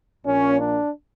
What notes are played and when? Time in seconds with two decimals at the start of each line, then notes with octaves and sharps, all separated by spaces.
0.24 A#1 A#2 A#3 C#4
0.58 D4